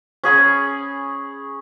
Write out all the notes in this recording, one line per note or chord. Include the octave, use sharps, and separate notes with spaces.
C#4 G#4 B5